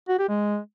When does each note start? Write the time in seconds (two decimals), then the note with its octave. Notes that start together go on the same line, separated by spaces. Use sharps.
0.09 F#4
0.19 G4
0.29 G#3